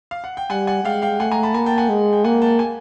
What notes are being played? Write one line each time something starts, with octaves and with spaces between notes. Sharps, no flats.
F5
F#5
G5
G3 F#5 G#5
F#5 G#5
G#3 F5 G5
F5 G5
A3 F#5 G#5
G#5 A#5
A5 B5
A#3 G#5 A#5
G5 A5
F#5 G#5
G#3
G5
A#3 F#5 G#5
G5 A5
G#5